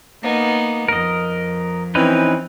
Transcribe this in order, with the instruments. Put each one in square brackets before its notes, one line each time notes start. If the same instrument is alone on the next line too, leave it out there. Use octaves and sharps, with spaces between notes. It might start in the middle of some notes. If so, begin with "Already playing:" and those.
[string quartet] A#3 B3 D#4
[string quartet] F2 [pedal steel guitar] A#4 D#5
[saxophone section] E3 C4 [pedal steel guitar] C#4 D#4 B4